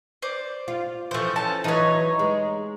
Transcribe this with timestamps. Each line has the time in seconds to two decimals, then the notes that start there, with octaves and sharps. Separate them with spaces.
0.22 C5 D5
0.68 F4
1.11 E3 F3 A3 C5
1.36 C#4 A4 A5
1.64 E3 F#3 D#4 B4 C#5
2.19 G#3